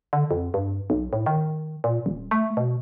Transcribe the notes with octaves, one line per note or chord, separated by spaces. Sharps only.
D3
F2
G2
B1
A2
D#3
A#2
D#1
A3
B2